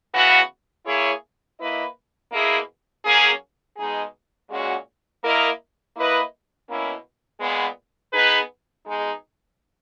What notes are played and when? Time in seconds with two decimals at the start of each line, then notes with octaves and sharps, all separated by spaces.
0.13 C#3 E3 B3 F#4
0.86 A#3 E4 G#4 C#5
1.59 A#3 E4 B4 D#5
2.31 B2 A#3 E4 G#4
3.05 F#3 A#3 C#4 G#4
3.77 B2 G#3 D#4 G#4
4.49 A#2 G#3 C#4 F#4
5.22 A#3 E4 A#4 D#5
5.95 A#3 E4 B4 D#5
6.68 B2 A#3 C#4 E4
7.40 A#2 G#3 B3
8.13 B3 D#4 G#4 B4
8.85 B2 G#3 D#4 G#4